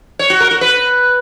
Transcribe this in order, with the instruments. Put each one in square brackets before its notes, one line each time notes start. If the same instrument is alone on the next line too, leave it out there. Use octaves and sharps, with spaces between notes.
[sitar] C#5
F#4
A#4
F#4
B4